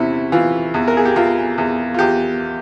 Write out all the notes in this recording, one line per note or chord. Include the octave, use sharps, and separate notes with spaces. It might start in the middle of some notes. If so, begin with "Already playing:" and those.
Already playing: E2 C3 C#4 E4
E3 F4
E2
A#4
G#4
G4
E2 F4
E2
F4
E2 G4